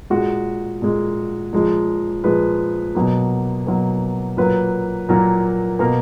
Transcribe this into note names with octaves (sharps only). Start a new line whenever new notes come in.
A#2 G#3 F#4
A#2 G#3
A#2 F3 G#3
A#2 F3 G#3 B4
B2 F#3 A#3
B2 F#3 A#3
A#2 F#3 A#3 B4
A#2 F#3 A#3 A#4
B2 A#3 A#4